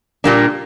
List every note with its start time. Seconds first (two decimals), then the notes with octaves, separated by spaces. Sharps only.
0.24 A#2 G3 A#3 D4